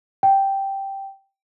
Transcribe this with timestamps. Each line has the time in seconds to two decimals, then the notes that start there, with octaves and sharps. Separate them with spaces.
0.23 G5